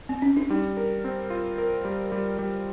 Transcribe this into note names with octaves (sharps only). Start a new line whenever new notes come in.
C4
C#4
D4
G3 D#4
A#4
C4
F4
A#4
G3
G3
G3